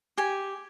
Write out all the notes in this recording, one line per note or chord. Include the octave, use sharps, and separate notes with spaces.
G4 G#5